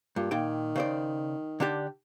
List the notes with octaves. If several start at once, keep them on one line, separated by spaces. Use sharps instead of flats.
G2 A#2
A#2 D#3 G5
C#3 C5 D5
D3 D4 G4